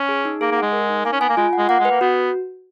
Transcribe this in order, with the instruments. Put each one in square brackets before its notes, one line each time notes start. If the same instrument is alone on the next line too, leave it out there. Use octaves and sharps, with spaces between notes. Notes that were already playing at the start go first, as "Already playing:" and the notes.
Already playing: [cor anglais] C#4
[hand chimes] G#4
D#4
[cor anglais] A#3 [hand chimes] G#4
[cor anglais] A#3
[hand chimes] F#5
[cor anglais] G#3
[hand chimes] A#4
D#4
[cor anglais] A#3 [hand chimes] G#5
[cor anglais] C#4
[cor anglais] B3 [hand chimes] G#5
[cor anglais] A#3
[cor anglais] G#3 [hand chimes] F4
[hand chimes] F#5
[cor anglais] G#3
[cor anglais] A#3 [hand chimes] F#5
[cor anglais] G#3
[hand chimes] B4
[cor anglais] A#3
[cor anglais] B3 [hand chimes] F#4